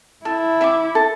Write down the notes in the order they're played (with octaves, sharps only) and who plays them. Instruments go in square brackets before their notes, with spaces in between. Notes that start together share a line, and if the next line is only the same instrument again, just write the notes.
[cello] E4 [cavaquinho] A4
[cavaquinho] E5 B5 D6
A4